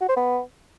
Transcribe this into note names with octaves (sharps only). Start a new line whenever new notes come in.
F#4
C5
B3